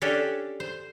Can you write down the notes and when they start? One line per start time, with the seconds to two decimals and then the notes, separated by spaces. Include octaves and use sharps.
0.02 C#4 D4 G4 A4
0.60 C5